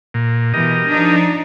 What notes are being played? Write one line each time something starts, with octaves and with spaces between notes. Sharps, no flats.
A#2
B2 E3 G4 A#4 D#5
F3 D4 D#4